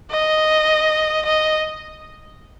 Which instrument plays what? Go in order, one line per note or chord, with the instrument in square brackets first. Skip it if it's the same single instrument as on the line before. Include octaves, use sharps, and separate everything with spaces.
[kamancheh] D#5
D#5